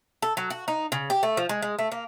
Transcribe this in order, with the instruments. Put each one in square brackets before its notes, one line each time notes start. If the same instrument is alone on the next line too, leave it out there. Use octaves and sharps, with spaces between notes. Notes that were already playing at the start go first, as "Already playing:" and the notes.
[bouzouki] A4
F#3
F#4
D#4
C#3
G4
A3
F3
G#3
G#3
A3
A#3